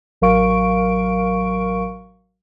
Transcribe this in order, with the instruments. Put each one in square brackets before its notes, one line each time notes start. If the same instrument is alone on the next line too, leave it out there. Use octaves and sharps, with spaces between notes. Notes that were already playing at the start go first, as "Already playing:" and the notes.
[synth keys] A1 F#3 A#4 F5 C#6 D7